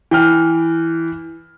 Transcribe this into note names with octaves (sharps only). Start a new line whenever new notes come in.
E3 G5 F6